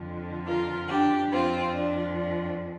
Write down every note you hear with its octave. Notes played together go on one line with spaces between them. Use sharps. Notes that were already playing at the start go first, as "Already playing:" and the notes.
Already playing: F2 D3 F3
F4 A#4
D4 G4
F2 F3 C4 F4
D4
D4